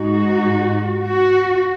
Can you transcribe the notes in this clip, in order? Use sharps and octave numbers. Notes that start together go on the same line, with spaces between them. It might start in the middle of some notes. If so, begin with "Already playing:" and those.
Already playing: G#2 G#3 D#4 F#4
F#4